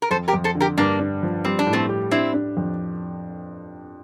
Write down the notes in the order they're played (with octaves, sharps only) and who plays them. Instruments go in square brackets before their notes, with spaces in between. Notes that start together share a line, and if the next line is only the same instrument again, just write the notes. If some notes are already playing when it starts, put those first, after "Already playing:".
[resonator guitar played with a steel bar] A#4
[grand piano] F2 [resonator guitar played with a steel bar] A4 C5
[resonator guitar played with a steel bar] G4 A#4
[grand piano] F2
[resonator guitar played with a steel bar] A4 C5
[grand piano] D3
[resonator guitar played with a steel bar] G4 A#4
[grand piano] G2 [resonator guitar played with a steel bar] A#3 D4
[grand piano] D4
F3
[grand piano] G3 [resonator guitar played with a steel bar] C4
[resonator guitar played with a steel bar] D4
[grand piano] A2
[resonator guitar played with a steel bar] A3 C4
[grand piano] G4
[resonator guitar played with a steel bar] C4 E4 [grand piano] D4
[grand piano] D4
F2